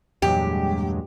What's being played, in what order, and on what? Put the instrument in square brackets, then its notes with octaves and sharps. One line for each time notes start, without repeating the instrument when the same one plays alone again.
[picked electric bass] E2 A#2 [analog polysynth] G2 F#3 G#3 [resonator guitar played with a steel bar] G4